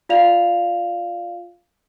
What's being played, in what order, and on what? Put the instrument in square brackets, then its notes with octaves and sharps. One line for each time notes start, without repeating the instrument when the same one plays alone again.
[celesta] F4 D5 F5 F7